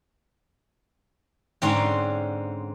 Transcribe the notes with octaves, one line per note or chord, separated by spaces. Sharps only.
G#2 D3 C4 C#4 C6